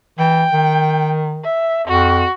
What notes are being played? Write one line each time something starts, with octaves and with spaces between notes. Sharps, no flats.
E3 G5
D#3
E5
F2 F#4